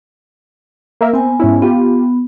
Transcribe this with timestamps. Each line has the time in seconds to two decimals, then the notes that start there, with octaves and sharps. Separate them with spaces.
1.01 A#3 A#4 E5
1.13 B3 C4 G#5
1.40 G#2 C#4 E4
1.62 B3 F4 G4